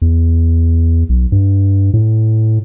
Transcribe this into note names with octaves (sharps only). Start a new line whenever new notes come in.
E2
B1
G2
A2